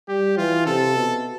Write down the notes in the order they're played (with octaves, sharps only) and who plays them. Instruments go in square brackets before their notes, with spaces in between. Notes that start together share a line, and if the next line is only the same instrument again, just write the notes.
[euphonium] G3 [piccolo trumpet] G4
[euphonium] E3 [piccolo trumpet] F4
[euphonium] C3 [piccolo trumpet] A4
[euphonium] B2